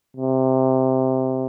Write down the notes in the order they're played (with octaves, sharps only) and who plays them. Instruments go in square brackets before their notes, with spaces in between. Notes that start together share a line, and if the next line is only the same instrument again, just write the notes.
[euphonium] C3